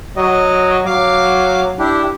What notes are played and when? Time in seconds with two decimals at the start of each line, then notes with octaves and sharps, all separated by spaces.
0.16 F#3 D#5
0.85 F#3 F5 D6
1.79 D4 E4 G4